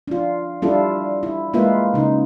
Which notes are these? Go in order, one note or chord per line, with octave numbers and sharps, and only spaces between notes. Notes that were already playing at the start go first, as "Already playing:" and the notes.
D4 F4
G3 D4 E4 F4 A4
E4
G#3 A#3 E4 F4 B4 E5
C#3 D#4